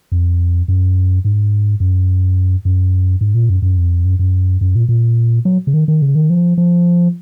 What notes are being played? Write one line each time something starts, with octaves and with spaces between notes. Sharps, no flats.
F2
F#2
G#2
F#2
F#2
G#2
A#2
F#2
F#2
F2
F#2
F#2
F#2
A#2
A#2
F#3
C#3
D#3
D#3
C#3
D#3
F3
F3